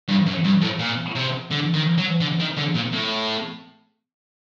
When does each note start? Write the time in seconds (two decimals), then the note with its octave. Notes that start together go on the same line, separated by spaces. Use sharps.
0.08 G2
0.26 F#2
0.44 G2
0.61 A2
0.79 A#2
1.15 C3
1.51 D3
1.74 D#3
1.98 F#3
2.21 D3
2.39 D#3
2.57 D3
2.74 A#2
2.92 A2